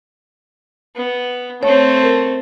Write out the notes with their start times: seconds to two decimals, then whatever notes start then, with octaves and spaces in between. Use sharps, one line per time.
0.96 B3
1.63 A3 C4 C#5
2.03 A#4